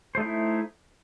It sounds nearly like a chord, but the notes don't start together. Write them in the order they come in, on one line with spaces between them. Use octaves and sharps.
C5 A3 D#4 E4